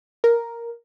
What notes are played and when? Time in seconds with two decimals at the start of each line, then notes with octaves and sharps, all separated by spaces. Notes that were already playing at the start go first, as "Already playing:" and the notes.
0.24 A#4